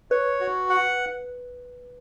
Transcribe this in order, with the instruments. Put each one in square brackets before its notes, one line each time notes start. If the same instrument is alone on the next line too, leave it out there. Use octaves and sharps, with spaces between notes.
[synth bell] B4 [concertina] C#5
[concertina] F#4
F#5